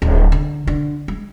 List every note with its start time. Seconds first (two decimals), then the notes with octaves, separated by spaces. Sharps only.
0.02 D1
0.32 D3
0.67 D3
1.08 G#3